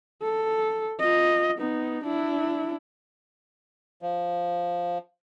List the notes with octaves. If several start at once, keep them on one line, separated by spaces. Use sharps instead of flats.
A4
F4 D#5
B3 D#4
D4 E4
F3